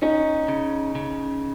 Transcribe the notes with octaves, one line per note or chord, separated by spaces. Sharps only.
C#4 D#4
C#3
C#3